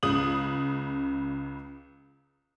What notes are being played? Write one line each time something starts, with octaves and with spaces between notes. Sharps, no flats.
C#2 C#3 D#6 F#7